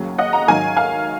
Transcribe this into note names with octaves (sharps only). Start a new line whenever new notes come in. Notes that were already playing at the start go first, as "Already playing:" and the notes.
Already playing: D#2 C#3 F#3
D#5 F#5
F#5 A#5
G#2 D#3 F#3 F5 G#5
F5 G#5